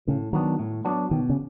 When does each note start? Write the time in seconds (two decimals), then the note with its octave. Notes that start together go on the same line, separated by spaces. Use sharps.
0.08 A2 C#3
0.33 D#3 F#3 B3 D4
0.59 A2
0.85 F#3 B3 D4
1.11 B2 D#3
1.29 C#3